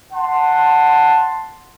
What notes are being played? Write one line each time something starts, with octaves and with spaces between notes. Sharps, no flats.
F#5 A5 C6